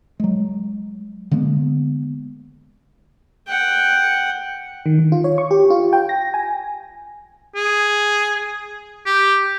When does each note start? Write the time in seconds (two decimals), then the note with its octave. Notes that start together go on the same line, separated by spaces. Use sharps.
0.20 F#3 G#3
1.31 D3 G#3 A#3 B3
3.48 F#5 G5
4.86 D#3
4.99 D#3
5.12 F4
5.24 C#5
5.38 C#6
5.51 G4
5.70 F4
5.93 G5
6.09 A#6
6.34 G#5
7.55 G#4
9.06 G4